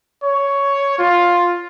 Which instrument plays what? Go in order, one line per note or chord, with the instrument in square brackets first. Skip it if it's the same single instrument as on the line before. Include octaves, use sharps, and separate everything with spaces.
[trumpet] C#5
F4